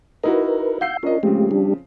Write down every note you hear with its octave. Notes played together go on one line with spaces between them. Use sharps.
D#4 E4 F#4 A#4 B4
F5 F#5 E6 G6 C7
C#4 D4 F4 A#4 D#5
C#3 F3 G#3 A3 C4 G4
G3 D4 G4